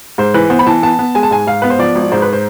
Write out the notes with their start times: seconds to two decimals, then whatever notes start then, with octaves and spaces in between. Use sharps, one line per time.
0.18 G#2 C5
0.34 E3 B4
0.50 B3 C5
0.59 B5
0.66 E3 A5
0.83 B3 A5
0.99 B3
1.15 G#3 G#5
1.23 A5
1.31 G#2 G#5
1.47 G#2 F5
1.62 B3 B4
1.70 C5
1.79 F3 D5
1.95 G#1
2.12 G#2 C5
2.22 B4
2.33 C5